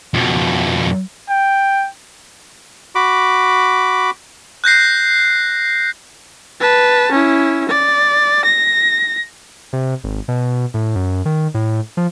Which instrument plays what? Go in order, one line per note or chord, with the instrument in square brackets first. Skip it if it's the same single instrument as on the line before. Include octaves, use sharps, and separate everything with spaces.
[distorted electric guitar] F2 B2
[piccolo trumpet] G5
[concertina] F#4 B5 D6
[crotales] F#6 G6 A#6 C7
[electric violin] B4 A5
C#4 E4
D5
A#6
[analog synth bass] C3
G#1
B2
A2
F#2
D#3
A2
F3